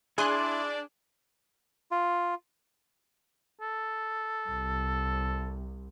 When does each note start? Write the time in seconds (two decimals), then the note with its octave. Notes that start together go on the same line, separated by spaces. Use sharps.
0.18 D4 E4 G#4 D5 G#5 C6 F#6
1.91 F4
3.61 A4
4.47 C2